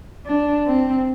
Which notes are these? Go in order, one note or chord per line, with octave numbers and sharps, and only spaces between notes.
D4
C4